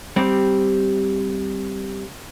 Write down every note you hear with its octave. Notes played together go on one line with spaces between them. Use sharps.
G3 C4 G4